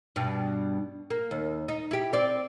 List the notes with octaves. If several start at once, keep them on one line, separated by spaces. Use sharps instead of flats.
G2 B2
A#3
D#2
D#4
E4 G4
C4 D5